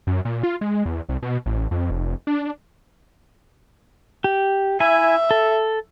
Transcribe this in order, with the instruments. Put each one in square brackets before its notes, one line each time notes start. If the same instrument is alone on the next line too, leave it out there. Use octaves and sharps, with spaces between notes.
[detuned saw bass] F#2
A#2
F4
G#3
E2
C2
B2
A1
F2
F1
D4
[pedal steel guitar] G4
[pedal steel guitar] E4 G#5 [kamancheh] E5
[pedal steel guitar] A4